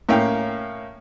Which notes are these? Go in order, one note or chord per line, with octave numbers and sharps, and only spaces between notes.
A2 A#3 C#4 E5 F5 G5